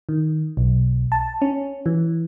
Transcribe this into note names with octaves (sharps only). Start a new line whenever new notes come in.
D#3
B1
A5
C#4
E3